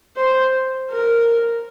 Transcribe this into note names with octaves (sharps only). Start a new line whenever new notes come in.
C5
A#4